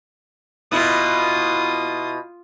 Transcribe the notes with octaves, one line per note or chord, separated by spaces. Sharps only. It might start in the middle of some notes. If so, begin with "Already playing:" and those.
B2 E4 F4 D#6